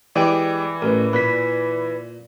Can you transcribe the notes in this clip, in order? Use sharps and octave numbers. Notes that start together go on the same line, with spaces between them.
E3 G#3 G4 D5 G5
A1 A#4 B4
A#2 B4 B6